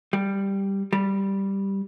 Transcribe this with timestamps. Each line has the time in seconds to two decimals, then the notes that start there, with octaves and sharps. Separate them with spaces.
0.13 G3
0.93 G3